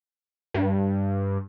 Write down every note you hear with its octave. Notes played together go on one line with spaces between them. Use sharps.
G2